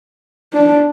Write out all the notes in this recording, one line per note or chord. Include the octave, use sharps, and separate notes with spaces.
D4